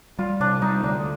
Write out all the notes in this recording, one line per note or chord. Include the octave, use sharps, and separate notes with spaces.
G3 F4
C3 D4
G3 D#4
D2 D4